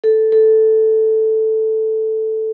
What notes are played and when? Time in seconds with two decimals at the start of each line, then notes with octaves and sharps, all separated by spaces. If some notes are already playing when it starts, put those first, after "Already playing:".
0.04 A4
0.32 A4